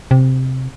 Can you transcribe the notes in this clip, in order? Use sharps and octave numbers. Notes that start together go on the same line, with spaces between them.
C3